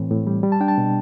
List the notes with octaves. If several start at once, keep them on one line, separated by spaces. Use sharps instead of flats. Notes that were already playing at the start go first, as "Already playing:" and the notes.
Already playing: A2 E3 C4
A2
G3
G3
A5
D4 G5
A5
B2